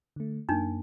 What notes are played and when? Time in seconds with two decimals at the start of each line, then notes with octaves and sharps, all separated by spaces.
0.16 D3 A3
0.49 F#2 A#3 D4 D#4